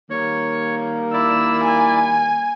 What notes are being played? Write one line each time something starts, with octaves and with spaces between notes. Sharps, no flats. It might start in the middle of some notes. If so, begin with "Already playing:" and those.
D#3 G3 A#3 C#5
E4 D5 E6
G#5